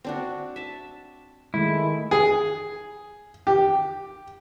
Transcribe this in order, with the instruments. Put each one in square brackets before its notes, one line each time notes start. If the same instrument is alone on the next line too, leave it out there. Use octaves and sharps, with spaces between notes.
[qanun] C4 D4 F#4
E5 A5
[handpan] D#3 G#3 A3 [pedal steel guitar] E4
[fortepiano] G#4
G4